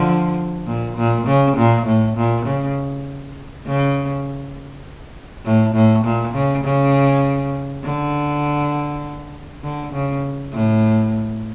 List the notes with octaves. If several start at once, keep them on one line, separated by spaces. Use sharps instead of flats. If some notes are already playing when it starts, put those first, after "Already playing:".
Already playing: D3 F3
A#2
A#2
C#3
A#2
A2
A#2
C#3
C#3
A2
A2
A#2
C#3
C#3
D3
D3
C#3
A2